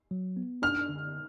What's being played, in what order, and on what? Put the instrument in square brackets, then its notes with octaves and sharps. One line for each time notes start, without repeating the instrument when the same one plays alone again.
[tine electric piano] F#3
B3
[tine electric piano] D4 [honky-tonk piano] F6
[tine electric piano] D3